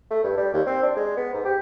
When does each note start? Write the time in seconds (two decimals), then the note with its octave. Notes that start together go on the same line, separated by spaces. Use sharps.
0.10 A3
0.23 G2
0.37 G3
0.53 D#2
0.66 C4
0.82 D4
0.96 G#3
1.17 B3
1.33 G#2
1.45 G4